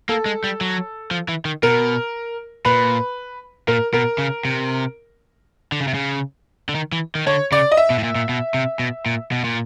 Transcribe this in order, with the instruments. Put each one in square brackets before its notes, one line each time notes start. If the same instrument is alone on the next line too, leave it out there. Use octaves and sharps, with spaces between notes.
[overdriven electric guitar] A#3 [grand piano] A4
[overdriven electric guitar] G#3
G3
F#3
F3
E3
D#3
[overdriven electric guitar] B2 [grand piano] A#4
[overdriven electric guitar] A#2 [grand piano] B4
[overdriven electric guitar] A#2 [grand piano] A#4
[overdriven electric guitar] B2 [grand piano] A#4
[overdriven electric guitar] C#3
C3
D3
C#3
C3
C#3
D3
D#3
E3
D#3
[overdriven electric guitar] D3 [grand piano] C#5
[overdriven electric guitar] C#3 [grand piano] D5
[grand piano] D#5
E5
[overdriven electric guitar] B2
A2
A#2
A#2
B2
C3
B2
A#2
B2
A#2